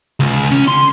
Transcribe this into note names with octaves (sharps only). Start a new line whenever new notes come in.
C#2
C#4
C6